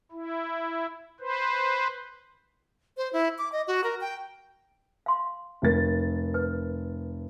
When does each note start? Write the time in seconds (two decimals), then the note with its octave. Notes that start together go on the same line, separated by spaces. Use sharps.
0.12 E4
1.20 B4 C5
2.97 C5
3.13 E4
3.38 D6
3.52 D#5
3.67 F#4
3.84 A#4
4.01 G5
5.06 F5 C6
5.62 F1 A#4 A6
6.34 B4